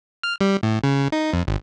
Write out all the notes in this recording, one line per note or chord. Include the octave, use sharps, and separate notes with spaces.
F6
G3
A2
C#3
D#4
F2
G#1